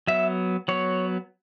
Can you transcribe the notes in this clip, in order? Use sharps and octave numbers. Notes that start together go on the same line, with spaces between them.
F#3 B3 E5
F#3 B3 C#5